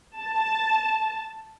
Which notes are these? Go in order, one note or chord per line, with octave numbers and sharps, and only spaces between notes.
A5